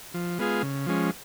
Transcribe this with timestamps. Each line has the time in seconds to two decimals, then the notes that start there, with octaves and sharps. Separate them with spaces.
0.14 F3
0.39 G#3 B3 F4 G#4
0.63 C#3
0.86 F3 G#3 C#4